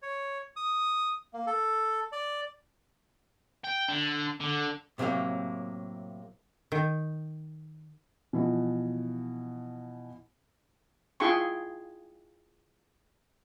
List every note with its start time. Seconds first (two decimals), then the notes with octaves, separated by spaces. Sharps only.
0.02 C#5
0.56 D#6
1.34 A#3
1.47 A4
2.12 D5
3.64 G5
3.88 D3
4.40 D3
4.98 A2 C3 F#3 G3 A#3
6.72 D#3
8.33 B2 E3 F3
11.20 E4 F4 G#4 G5 C6 C#6